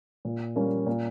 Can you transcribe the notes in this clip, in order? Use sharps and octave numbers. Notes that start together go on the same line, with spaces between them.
A#2
G3 A#3 C#4
A#2